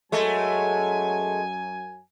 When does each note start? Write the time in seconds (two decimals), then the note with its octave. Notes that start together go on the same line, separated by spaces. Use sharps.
0.12 F#2 F#3 G#3 A3 G#5